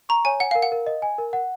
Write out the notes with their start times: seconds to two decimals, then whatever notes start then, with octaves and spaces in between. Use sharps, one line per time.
0.09 A#5 C#6
0.25 C#5 G#5
0.40 F#5 G#5
0.51 A#4 F5
0.62 F#5
0.72 A#4
0.87 D#5
1.02 G#5
1.18 A#4
1.33 F#5